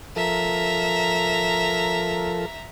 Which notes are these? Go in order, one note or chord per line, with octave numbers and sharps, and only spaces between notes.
F3 A4 A#4 E5 A#5